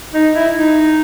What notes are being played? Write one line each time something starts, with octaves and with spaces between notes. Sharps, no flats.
D#4
E4
D#4